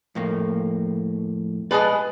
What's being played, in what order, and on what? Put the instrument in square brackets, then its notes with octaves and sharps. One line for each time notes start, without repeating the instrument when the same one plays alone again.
[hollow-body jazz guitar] F2 A2 A#3
[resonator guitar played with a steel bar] G#3 G#4 B4 [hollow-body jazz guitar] D5 F5 A5